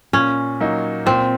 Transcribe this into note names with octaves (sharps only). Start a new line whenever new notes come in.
A#2 C#4
F#3 A#3 D#4
A#2 C4